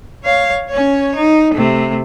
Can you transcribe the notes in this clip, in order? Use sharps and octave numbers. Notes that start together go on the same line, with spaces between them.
C#5 F5
C#4 C#5
D#4
C3 A3